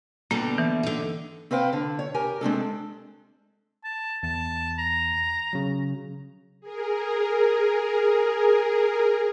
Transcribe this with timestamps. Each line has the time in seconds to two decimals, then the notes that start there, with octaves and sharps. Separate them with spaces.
0.31 B2 D3 G3 A#3
0.58 E3
0.83 D3 D#4
1.51 C4 B4 C5 F5 G5
1.73 D3
1.99 C#5
2.14 G4 A#4 G#5
2.41 G#3 C4 D4 A4
3.84 A5
4.23 E2 A5
4.79 A#5
5.53 C#3 F#3
6.60 G#4 A#4